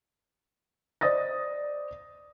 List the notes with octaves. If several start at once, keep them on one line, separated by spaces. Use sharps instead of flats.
C5 D5 D#5 D#6 A6 A#6